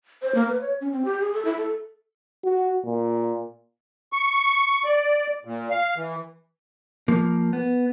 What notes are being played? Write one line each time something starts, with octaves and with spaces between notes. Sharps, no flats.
C5
A#3
B4
C#5
C#4
C4
G4
G#4
A4
E4
A4
F#4
A#2
C#6
D5
A#2
F5
E3
F3 A#3
B3